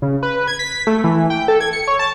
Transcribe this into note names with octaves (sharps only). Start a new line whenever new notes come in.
C#3
B4
G#6
B6
A3
E3
G5
A4
G#6
C#7
C#5
A5